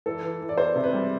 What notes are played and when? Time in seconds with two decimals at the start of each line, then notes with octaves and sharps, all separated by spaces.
0.06 E3 A4
0.23 E3
0.41 E3
0.49 D5
0.58 B3 C5
0.76 C3
0.84 B4
0.93 G3